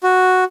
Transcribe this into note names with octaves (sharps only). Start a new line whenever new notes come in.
F#4